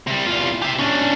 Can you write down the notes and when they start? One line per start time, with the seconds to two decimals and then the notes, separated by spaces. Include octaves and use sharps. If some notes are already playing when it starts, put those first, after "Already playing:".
0.07 C3 G3
0.27 E2 F4
0.62 G4 E5
0.79 C#4 D4